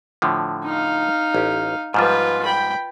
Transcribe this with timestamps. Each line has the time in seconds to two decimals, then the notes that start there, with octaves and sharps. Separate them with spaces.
0.22 A2 D3 F3
0.65 D#4 F5
1.35 A1 G4
1.94 G#2 F3 G3 F4 B4
2.45 G5 B5